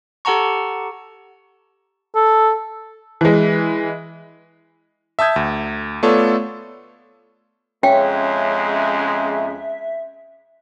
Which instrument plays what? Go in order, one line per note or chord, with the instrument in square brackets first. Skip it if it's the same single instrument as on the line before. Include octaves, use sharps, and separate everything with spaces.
[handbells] G4 A4 F#5 A5 A#5 C#6
[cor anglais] A4
[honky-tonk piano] E3 G#3
[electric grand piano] E5 A5 D#6 G6 G#6
D2
A3 B3 F4 A4 C#5 D5
[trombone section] F2 G#3 [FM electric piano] C#4 [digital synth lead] E5 [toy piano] G5